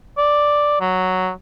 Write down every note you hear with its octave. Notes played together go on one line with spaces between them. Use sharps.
D5
F#3